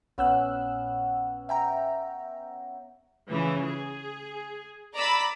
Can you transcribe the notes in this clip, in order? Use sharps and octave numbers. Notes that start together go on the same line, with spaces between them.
A#1 B3 C#4 E6 F#6
E5 G5 A#5
C#3 E3
G#4
D5 A#5 B5 E6